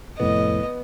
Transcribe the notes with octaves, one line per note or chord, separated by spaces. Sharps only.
C2 F2 A2 B3 D#5